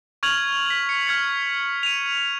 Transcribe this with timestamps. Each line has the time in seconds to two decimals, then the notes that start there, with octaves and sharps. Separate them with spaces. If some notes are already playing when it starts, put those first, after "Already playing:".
0.23 C#6 F6 G#6 F7 F#7
0.67 B6 F#7
0.89 C#7
1.07 F6 G#6 B6 C#7
1.83 D#7 F7